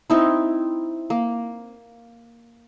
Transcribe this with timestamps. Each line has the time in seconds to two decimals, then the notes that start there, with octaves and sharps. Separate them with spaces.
0.10 C4 D#4 E4
1.10 A#3